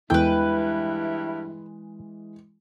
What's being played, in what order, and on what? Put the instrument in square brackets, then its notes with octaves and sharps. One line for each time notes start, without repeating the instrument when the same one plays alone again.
[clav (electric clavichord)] E2 A4 [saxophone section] G2 E4 [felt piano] E3 G#3 [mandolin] B4 G5